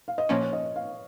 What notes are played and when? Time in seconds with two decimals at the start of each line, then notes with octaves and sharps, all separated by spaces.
0.08 F5
0.18 D#5
0.29 A#2 F3 A#3 C#4 C#5
0.42 C#5
0.53 D#5
0.76 F5